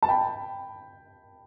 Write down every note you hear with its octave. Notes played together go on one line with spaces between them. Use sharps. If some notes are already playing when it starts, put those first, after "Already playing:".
A5
G5 B5